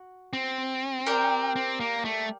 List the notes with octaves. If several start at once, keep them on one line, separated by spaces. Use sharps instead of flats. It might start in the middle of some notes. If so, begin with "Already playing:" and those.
Already playing: F#4
C4
G4 A#4 D5
C4
A#3
A3